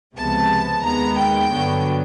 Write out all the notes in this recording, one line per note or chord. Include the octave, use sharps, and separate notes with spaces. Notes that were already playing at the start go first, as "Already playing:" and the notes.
C#2 C3 F3 G#3 B3 A5
D#2 D#3 G#3 B3 A#5
G5
G2 D3 F#3 B3